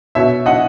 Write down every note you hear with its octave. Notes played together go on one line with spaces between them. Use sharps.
B2 C#5 E5
D#5 F#5